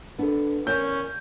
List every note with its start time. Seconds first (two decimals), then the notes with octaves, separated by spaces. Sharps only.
0.18 B3 D4 A4
0.67 E2 C#4 A#4 C#5 G6